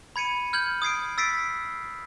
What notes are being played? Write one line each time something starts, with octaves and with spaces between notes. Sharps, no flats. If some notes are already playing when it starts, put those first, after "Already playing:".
B5 G#6 C#7 D#7
F6 G6 G#6 F#7
D#6 G#6 C7 D7
E6 A6 B6 C7 D7